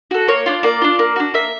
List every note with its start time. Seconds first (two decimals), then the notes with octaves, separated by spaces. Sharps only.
0.11 F#4 A4
0.28 A#3 C#5
0.46 D4 F4
0.63 A#3 D5
0.82 D4 F4
0.99 A#3
1.16 D4 F#4
1.34 A#3 E5